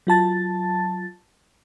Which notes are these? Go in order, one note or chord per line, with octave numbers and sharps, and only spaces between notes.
F#3 F4 A5 A6